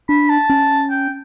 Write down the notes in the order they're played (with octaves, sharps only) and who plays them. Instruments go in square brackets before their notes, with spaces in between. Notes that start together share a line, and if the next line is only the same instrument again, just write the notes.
[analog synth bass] D4 [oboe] B5
[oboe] A5
[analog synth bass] C#4
[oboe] G5